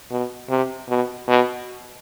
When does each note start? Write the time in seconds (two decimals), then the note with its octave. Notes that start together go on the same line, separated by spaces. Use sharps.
0.11 B2
0.49 C3
0.89 B2
1.28 B2